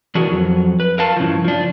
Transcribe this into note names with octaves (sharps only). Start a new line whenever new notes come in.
E3 D4 F#4 G#4 A#4
F2 F#3
B4
A#4 F5 A5
G2 C#3 E3 F3
F3 D4